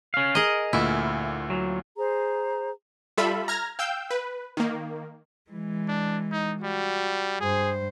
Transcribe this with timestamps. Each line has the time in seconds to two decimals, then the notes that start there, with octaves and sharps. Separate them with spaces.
0.14 C#4 F5
0.35 G#4 A#4 D#5
0.73 D2 A#2 E4
1.50 F#3
1.97 G#4 C5 A#5
3.17 G3 F4 A4 E5 B5
3.48 A#5 F6 G#6 A#6
3.79 F5 G5 E6 G6
4.11 B4
4.57 D#3 A#3
5.51 E3 G#3
5.88 D4
6.32 D#4
6.63 G3 F#4
7.41 G2 G#4 C5